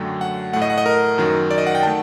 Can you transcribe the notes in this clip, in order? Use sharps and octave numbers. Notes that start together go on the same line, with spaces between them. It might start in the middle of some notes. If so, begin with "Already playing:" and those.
Already playing: F#2 D3 F#3 A3 G5
F#5
A2 A3 F#5
D#5
F#5
D#5
A#4
F#2 D#3 F#3
D5
D#5
F#5
G5
D#3 A3 A5